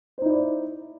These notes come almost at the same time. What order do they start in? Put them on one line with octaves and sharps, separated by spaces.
C5 D#4 E4 D5